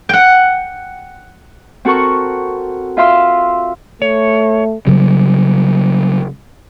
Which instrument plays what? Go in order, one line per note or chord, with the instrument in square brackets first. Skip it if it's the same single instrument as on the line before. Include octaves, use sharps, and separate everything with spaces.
[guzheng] F#5 G5
[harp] C4 F#4 A4 A#4 C#6
F4 E5 F5 C6 E6
[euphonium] A3 [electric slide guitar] C#5
[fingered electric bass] C#3 F#3 G3